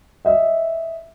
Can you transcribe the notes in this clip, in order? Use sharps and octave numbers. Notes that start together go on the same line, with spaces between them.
D#5 E5